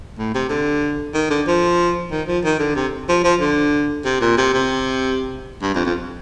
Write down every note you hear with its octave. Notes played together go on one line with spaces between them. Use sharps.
A2
C3
D3
D#3
D3
F3
D#3
F3
D#3
D3
C3
F3
F3
D3
C3
A#2
C3
C3
G2
F2
F2